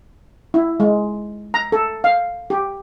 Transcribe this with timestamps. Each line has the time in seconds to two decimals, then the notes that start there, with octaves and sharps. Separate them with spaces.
0.54 E4
0.80 G#3
1.54 A#5
1.72 A4
2.04 F5
2.50 G4